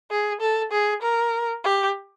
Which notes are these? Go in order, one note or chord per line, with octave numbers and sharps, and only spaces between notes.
G#4
A4
G#4
A#4
G4